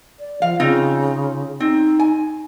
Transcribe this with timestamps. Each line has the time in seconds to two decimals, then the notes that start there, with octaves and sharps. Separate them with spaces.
0.20 D5
0.42 F3 F5
0.60 C#3 C4 D#4 F4
1.60 C4 D#4
1.99 G#5